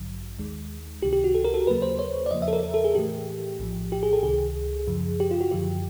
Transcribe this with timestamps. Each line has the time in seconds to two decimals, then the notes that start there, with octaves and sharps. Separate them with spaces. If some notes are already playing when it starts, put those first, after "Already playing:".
Already playing: A1 G2 D3 F#3
0.39 D#2 D#3 G#3
1.02 C#2 C3 D#3 G4
1.13 G4
1.24 F#4
1.35 A4
1.44 A#4
1.54 A4
1.67 D#2 C#3 F#3 A#3 B4
1.82 C5
1.99 C#5
2.26 D5
2.31 E2 C#3 F3 A#3 D#5
2.42 E5
2.48 A4
2.53 A#4
2.63 A4
2.74 A4
2.84 G#4
2.95 A2 E3 A3 G4
3.59 A#1 A2 F3
3.92 G4
4.03 G#4
4.13 A4
4.23 C#2 C3 D#3 G#4
4.87 F#2 C#3 F3
5.20 G4
5.31 F4
5.41 F#4
5.51 F#2 D3 F3 G4